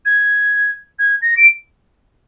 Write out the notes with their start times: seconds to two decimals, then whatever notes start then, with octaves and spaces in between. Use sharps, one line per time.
0.06 G#6
0.99 G#6
1.22 A#6
1.37 D7